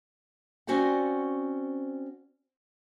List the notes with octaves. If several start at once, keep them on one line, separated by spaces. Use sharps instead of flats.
C4 C#4 F#4 C5 D5 F#5